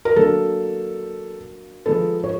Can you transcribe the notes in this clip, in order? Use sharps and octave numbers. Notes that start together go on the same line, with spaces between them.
A#4
F#3 A#3 D4 A4
F3 G#3 B3 A4
C#5